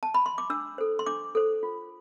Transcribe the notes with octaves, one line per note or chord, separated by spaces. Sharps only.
A5
B5
C6
D6
D4 E6
A4 C5
C6
D4 D6
A4 C5
F4